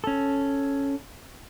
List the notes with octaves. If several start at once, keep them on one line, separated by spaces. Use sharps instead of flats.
C#4 A4